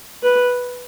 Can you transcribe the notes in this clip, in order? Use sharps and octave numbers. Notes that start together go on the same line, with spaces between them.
B4